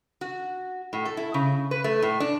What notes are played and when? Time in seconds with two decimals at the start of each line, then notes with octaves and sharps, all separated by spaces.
0.21 F#4
0.93 A2
1.05 A4
1.17 E4
1.34 C#3
1.71 B4
1.84 A3
2.02 A2
2.20 D4